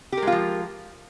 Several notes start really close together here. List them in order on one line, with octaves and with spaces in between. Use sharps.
G4 A#4 G#3 F4 F3